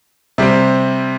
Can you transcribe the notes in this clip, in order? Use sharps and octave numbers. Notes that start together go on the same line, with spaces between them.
C3 G3 C4